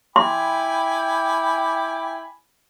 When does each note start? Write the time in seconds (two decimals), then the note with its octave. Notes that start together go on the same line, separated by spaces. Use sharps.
0.16 E4 G5 G#5 B5 C6 D6